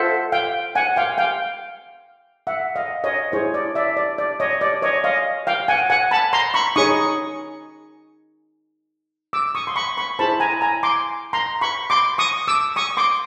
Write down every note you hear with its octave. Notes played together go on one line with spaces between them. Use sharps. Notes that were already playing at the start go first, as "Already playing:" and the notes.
Already playing: F4 A4 C5 E5 F#5
F5 G5
F#5 G#5
F5 G5
F5 G5
E5 F#5
D#5 F5
C#5 D#5
E4 G#4 C5 C#5
D5
D5 E5
D5
D5
C#5 D#5
D5
C#5 D#5
D#5 F5
F5 G5
F#5 G#5
F#5 G#5
A5 B5
A#5 C6
B5 C#6
D#4 G#4 C#5 C#6 D#6
D6 E6
C#6 D#6
C6
B5 C#6
B5 C#6
E4 G#4 C5 A5 B5
G#5 A#5
G#5 A#5
C6 D6
A#5 C6
B5 C#6
C6 D6
C#6 D#6
D6 E6
C#6 D#6
C6 D6